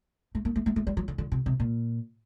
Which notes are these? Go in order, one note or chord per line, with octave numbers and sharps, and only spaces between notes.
A3
A#3
A3
A3
A3
G3
F#3
D3
D3
C3
C3
A#2